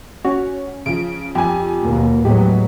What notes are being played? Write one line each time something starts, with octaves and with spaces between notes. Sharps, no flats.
C#4 F#4
C#3 F3 D7
F2 G4 G#5
D#2 B2 A#3
A2 F#3 G#3 B3 G4